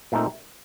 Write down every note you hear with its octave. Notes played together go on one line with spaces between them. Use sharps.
A#2 A3 C4 D#4 A#4